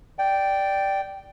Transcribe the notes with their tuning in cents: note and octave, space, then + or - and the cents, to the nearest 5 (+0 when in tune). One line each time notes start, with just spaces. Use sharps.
D5 +0 G5 -5